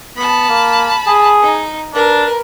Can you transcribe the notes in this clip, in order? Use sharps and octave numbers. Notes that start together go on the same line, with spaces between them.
B3 A5 B5
A#3
G#4
D#4
D4 A#4 B4